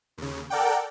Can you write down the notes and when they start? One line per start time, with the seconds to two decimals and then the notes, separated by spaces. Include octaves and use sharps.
0.18 D#2 C#3
0.50 A4 A#4 D5 F#5 G5